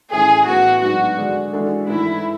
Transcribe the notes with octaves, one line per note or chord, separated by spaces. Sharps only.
A2 E3 A3 C#4 G#4
A2 E3 B3 F#4
G#2 F#3 B3 D4 F#4 G#4
D3 G#3 D4 G#4 D5
E3 G#3 D4 F#4 A4
G#2 E3 A3 E4